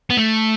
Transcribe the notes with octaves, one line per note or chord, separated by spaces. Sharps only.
B3
A3